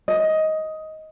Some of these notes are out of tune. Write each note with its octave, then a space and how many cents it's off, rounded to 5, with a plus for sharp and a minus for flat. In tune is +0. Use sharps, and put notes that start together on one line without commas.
D#5 +10